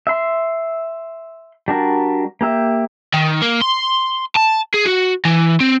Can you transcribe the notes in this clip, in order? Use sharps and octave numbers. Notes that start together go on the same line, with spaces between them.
E5 C6
G3 D4 F#4 A#4
A#3 G4 E5
D#3
A#3
C6
A5
G#4
F#4
E3
C4